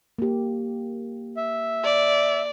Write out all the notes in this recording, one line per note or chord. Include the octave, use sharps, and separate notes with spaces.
A#3 G4
E5
D5